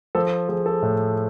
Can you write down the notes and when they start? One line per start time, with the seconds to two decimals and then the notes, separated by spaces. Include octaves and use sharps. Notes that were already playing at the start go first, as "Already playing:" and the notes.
0.15 F3 A4
0.49 F3 G#4
0.66 A4
0.82 A2